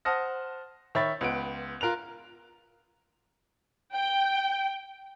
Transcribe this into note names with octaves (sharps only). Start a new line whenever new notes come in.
C5 F#5 A5 D#6 F6 A#6
D#3 C#5 E5 B5 A6
C#2 B3 D7
F4 A#4 F#6 F7
G5